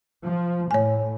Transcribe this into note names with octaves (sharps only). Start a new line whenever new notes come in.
F3
A2 C#5 G#5